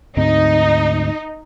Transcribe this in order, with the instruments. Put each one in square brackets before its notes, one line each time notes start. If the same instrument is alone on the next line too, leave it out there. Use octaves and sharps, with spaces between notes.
[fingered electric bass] D2 G#2 C4 [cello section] D#4